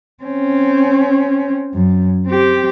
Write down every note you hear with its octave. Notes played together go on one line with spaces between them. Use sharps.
C4 C#4
F#2
C4 G4